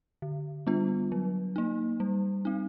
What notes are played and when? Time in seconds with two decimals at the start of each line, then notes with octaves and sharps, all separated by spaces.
0.22 D3
0.67 G3 B3 D4 F4
1.12 F#3
1.56 A#3 D#4
2.00 G3
2.45 C4 D#4